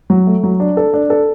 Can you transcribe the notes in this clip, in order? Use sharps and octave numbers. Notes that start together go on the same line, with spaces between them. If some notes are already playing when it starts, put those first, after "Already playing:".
F#3
A3
F#3
D4
A4
D4
A4